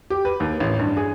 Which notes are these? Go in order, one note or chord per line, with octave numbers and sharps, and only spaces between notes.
G4
B4
D#2
A1
G2
G#4